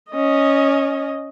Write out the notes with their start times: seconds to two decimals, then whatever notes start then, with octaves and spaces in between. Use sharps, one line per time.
0.11 C#4 D#5